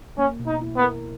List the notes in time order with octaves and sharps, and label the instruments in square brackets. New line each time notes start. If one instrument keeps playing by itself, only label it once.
[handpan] A#3 [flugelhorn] C#4
[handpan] B2
[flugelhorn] D#4
[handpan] E4
[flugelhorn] B3
[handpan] A#4